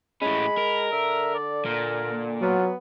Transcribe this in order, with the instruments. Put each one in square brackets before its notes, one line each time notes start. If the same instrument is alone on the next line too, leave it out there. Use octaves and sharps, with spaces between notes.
[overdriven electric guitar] A2 C#4 [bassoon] G#3 [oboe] B5
[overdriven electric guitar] A#4
[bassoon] D3 [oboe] E5
[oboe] D5
[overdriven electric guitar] A#2 [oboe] A#4
[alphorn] F#3 [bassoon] B3 [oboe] F4